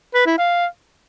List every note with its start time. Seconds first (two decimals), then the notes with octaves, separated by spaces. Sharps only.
0.14 B4
0.26 E4
0.38 F5